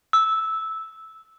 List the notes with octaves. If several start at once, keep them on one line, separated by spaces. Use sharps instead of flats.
E6